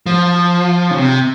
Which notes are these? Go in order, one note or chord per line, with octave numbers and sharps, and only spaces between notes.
F3
C#3
C3